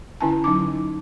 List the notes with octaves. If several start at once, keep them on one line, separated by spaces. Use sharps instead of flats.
D3 C#4 E4 G#5 A5
F#3 D#4 D6